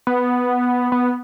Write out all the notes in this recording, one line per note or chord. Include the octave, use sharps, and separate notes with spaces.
B3
B3